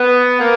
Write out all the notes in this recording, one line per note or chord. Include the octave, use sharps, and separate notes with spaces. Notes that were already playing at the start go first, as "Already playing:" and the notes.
Already playing: B3
A#3